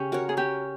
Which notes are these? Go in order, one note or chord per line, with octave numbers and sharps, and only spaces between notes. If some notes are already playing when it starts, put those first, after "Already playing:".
Already playing: C#3 C#4 G4
F#4 A#4 C#5
G#4
C#4 G4